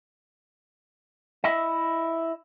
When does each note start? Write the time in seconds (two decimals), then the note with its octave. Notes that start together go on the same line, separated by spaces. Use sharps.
1.44 E4 D#5 E5